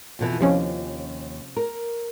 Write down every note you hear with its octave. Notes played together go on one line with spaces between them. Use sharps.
F2 B2 E3
D#2 C3 F3 C#4
A#4